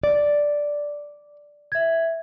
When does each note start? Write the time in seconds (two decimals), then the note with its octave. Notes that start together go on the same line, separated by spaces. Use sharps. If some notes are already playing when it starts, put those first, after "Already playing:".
0.03 D5
1.72 E5 G#6